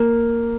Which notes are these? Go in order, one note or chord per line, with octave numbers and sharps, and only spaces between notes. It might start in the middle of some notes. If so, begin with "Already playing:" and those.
Already playing: A#3